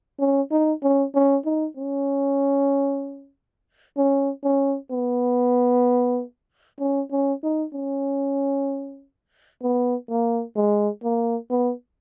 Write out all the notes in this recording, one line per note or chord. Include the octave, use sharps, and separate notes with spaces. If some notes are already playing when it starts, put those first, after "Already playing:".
C#4
D#4
C#4
C#4
D#4
C#4
C#4
C#4
B3
C#4
C#4
D#4
C#4
B3
A#3
G#3
A#3
B3